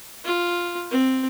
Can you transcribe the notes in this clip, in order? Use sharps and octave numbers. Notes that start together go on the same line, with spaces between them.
F4
C4